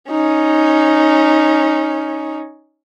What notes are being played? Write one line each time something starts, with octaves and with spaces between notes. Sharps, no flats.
C#4 D#4